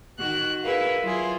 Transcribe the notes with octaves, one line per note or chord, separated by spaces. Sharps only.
D#3 F#4 F#6
E4 G#4 A#4 B4 F5
F#3 E4 F4 G#4